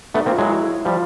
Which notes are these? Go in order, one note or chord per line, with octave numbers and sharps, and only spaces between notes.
A3 B3 D4
D#4
A#3 C4
F4
F#3 G#3 E4
F3 G3 F4